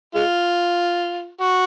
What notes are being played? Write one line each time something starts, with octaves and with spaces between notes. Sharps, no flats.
G#3 F4
F#4